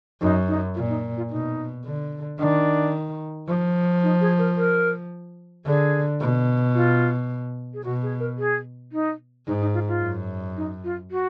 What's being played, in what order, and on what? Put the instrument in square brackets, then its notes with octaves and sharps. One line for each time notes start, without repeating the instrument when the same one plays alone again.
[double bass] F#2 [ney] D#4
[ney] D#4
[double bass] A#2 [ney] F4
[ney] D#4
F4
[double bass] B2 [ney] D#4
[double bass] D3
[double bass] D#3 [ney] D4
[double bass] F3
[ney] D#4
G#4
A#4
A#4
[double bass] D3 [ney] G#4
[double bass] B2
[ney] F4
G#4
[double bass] B2 [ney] F#4
[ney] G#4
A#4
G#4
D#4
[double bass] G#2 [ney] D#4
[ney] D#4
F4
F4
[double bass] F#2
[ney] D#4
F4
F#4